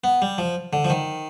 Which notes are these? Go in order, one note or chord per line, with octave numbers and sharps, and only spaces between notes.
B3
G3
F3
D3
F3
D#3